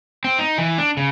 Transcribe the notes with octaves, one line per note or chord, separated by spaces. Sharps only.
C4
D#4
E3
D4
C#3